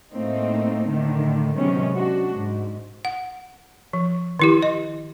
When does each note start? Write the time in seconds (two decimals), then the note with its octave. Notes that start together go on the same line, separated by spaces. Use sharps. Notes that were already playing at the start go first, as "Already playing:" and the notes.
0.12 A2 A3 A#3 C4 D#4
0.88 A2 D3 D#3 A3
1.56 C3 D#3 F#3 G#3 B3 C#4
1.93 D4 F#4
2.33 G#2
3.05 F#5
3.93 F3
4.40 D#3 E4 G4
4.63 D#5